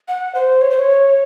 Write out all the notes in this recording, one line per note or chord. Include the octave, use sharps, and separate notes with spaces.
F#5
C5
C#5
C5
C#5